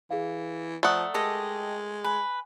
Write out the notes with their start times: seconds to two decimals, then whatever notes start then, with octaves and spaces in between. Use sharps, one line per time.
0.11 E3 G#4 F5
0.83 F3 A3 D5 F#5 A#5 D#6
1.14 G#3 G4 A4 A#4 D#5
2.04 B4 G#5